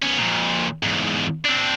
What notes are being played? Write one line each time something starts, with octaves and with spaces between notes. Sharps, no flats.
B3 C#4
F2 A#2
E2 G#2
C4 D4